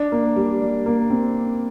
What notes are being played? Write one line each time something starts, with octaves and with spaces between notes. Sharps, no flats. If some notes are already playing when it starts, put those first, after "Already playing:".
Already playing: D4
A#3
G3
G3
A#3
C4